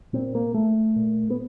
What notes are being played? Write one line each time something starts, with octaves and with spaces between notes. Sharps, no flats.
A#2 C4
A#3
A3
A#2
B3